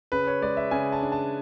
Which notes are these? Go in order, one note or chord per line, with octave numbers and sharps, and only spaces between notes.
C#3 B4
C#5
G#3 D5
E5
C#3 G#5
A5
D4
A5